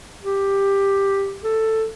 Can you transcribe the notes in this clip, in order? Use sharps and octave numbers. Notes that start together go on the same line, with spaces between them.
G4
A4